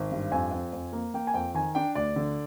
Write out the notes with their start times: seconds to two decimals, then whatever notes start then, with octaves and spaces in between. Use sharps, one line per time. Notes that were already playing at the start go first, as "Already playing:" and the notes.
Already playing: G#1
0.12 G2
0.32 F2 G#5
0.52 F2
0.73 F2
0.93 A#3
1.14 A#3 G5
1.27 G#5
1.34 F2 G5
1.54 D#3 G#5
1.75 D4 G5
1.95 D2 D5
2.16 D3